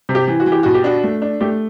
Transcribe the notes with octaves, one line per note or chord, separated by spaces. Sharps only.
C3
G4
E3
F#4
E3
G4
B2 F#4
G4
D4 F#4
A3
D4
A3 G4